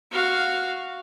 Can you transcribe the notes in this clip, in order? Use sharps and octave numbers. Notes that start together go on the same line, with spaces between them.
F#4 F5